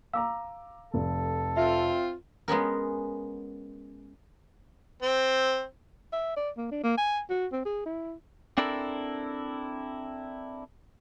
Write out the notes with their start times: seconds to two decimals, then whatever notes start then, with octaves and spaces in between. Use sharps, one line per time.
0.13 F5 A#5 D6 E6
0.94 F1 A4
1.57 C4 F4 E5
2.48 G#3 B3 C#4 A#4
5.02 C4
6.12 E5
6.37 D5
6.57 A#3
6.71 D4
6.84 A#3
6.98 G#5
7.29 F#4
7.52 C4
7.65 G#4
7.86 E4
8.58 C4 D4 E4 A4 A#4